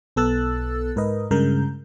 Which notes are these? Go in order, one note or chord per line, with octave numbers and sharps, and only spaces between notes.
B1 B3 A4 E6 F#6 A6
G#2 A#4 B4 D#5
G2 C#3 G#3 A#4 G6